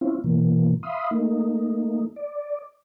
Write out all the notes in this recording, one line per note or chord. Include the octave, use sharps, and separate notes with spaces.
C4 C#4 E4 F4
B2 E3 A#3
E5 F5 B5 C6 D#6
A3 A#3 D#4
D5